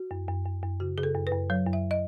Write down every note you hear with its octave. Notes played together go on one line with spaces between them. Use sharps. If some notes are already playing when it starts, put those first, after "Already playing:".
Already playing: F#4
F#2
F#2
F#2
F#2
C#3 F#4
C#3 G#4
A4
F#2
B4
F#2
F#3 C#5
F#2
E5
D#5